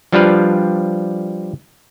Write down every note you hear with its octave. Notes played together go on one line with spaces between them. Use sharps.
F3 G3 D4 F4 B4 F5